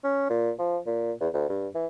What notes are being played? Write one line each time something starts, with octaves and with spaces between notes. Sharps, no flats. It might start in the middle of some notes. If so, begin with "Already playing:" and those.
C#4
A#2
F3
A#2
E2
D2
G2
E3